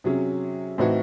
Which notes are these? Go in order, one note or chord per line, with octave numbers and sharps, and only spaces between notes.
C3 F#3 C#4 G#4
A2 E3 C4 D#4 F#4